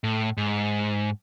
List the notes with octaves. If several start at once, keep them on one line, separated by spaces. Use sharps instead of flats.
A2
G#2